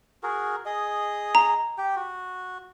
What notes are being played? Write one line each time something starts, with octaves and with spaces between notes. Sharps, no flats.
F#4 G#4 A#4
G#4 D#5
A#5
G4 G5
F#4